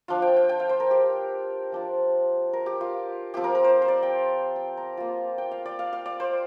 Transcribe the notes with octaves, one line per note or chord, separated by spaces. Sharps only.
F3 D4 F4 F5
G5
G5
G5
F5
C5
A#4
G4
F3 D4 F4
A#4
G4
F4
F3 C4 F4 G4
A#4
A#4
C5
C5
D5
G5
G5
A#5
A#3 F4
G5
F5
D5
F5
F5
D5
C5